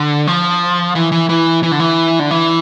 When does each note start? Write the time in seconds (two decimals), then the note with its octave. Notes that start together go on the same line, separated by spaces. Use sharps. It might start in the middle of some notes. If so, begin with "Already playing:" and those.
Already playing: D3
0.27 F3
0.95 E3
1.12 E3
1.29 E3
1.63 E3
1.72 D3
1.80 E3
2.19 D3
2.31 E3